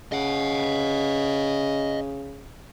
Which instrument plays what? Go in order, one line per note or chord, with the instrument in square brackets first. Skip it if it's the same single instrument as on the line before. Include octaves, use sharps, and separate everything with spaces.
[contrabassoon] C#3 [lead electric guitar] D#5 F#5